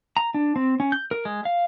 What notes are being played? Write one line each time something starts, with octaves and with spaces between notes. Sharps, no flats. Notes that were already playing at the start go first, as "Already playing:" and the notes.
A#5
D4
C4
C#4
G6
A#4
G#3
F5